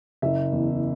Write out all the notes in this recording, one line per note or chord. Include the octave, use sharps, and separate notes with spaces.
F#1 E5
E2